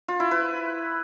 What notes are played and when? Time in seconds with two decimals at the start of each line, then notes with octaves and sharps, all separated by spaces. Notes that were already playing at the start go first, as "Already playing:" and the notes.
0.08 F4
0.20 E4
0.31 B4